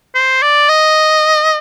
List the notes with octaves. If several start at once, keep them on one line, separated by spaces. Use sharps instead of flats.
C5
D5
D#5